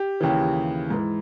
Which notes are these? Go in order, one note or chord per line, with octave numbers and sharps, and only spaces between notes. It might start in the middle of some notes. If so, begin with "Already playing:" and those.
Already playing: G4
D#2 C#3 E3
G#2 E3